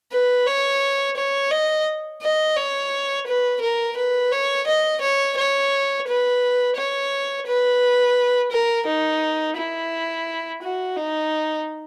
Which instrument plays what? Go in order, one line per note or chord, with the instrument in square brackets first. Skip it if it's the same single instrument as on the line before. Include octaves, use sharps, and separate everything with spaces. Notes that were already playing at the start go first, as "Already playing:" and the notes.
[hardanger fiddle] B4
C#5
C#5
D#5
D#5
C#5
B4
A#4
B4
C#5
D#5
C#5
C#5
B4
C#5
B4
A#4
D#4
E4
F#4
D#4